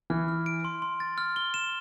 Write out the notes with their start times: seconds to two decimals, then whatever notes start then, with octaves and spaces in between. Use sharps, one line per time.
0.10 E3 F6
0.28 F6
0.46 D7
0.65 C6
0.82 C6
1.00 A6
1.18 F6
1.36 G7
1.54 E7